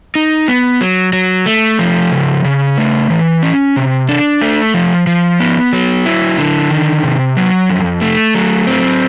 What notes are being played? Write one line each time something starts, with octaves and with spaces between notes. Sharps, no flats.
D#4
B3
F#3
F#3
A3
F3
C#3
C#3
A3
E3
C#4
C3
D4
A3
F3
F3
B3
F#3
E4
D3
D#3
C3
F#3
F2
A3
F#3
C4